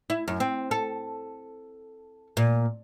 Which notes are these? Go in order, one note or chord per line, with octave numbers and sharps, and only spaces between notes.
E4
F#2
C4
A4
A#2